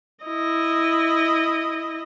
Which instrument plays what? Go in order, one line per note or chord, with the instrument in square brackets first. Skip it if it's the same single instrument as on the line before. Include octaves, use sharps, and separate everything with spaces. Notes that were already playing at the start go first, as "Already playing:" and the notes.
[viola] E4 D#5